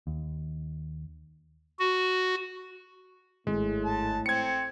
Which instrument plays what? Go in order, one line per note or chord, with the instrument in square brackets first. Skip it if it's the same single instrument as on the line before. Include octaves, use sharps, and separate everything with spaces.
[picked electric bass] D#2
[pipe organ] F#4
[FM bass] G#1 [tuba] A2 [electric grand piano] G#3
[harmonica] A5
[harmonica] C4 [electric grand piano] G#6 C#7